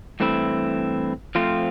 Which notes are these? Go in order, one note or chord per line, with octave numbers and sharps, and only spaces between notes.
G2 E3 A3 C4 E4
F3 A3 C4 F4